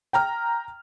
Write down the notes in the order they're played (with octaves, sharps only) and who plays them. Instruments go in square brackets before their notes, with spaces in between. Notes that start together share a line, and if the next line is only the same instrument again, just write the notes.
[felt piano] G5 A#5 F6